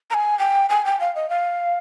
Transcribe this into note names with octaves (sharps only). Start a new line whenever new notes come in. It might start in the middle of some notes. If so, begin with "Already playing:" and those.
A#5
G#5
G5
G#5
G5
F5
D#5
F5